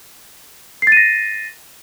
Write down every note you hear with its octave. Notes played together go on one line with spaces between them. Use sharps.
A6 A#6 C7 D#7